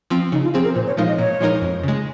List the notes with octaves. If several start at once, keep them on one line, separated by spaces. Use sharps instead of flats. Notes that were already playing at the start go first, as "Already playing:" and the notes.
F3 C4
C#3 D#4
F4
F3 C4 G#4
A#4
A#2 C5
C#5
F3 G#3 D#4 A#4 F5
D#5
A#2 C#5
F3 G#3 D#4 A#4
F2
C#3 G#3